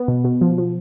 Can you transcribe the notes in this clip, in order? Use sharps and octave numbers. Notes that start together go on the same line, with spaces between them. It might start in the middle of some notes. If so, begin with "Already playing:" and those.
Already playing: B3
B2
B2
F3
F3